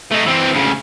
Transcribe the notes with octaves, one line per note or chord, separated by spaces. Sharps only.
A3 D#4
E3 C4
D2 C#3